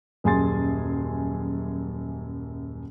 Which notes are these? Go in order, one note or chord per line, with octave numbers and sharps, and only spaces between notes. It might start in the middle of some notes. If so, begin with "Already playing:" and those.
D#1 F#2 G#4 G#5 C6 A6